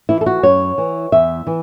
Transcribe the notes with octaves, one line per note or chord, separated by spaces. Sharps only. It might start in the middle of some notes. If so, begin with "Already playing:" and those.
E3 E4
A4
F#4
F#2 C#5
E3
E2 E5
E3